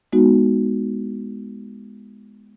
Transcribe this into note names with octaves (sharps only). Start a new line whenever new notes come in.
G#3 B3 D#4 F#4